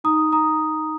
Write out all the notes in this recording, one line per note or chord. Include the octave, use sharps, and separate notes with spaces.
D#4 A#5 D#6
A#5 D#6